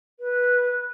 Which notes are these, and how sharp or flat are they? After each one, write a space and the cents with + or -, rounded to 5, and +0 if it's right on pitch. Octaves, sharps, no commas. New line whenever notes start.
B4 -10